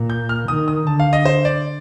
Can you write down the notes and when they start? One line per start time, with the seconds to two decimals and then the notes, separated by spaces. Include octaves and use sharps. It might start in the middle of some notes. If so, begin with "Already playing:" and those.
Already playing: A#2
0.10 G6
0.29 F6
0.48 D#3 D#6
0.68 D#6
0.87 D3 A5
1.00 F5
1.13 D#5
1.25 C5
1.45 D5